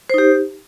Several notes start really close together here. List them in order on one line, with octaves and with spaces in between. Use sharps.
C5 D#4 G4